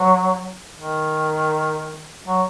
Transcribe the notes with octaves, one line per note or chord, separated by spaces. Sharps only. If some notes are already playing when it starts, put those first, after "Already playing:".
Already playing: F#3
D#3
F#3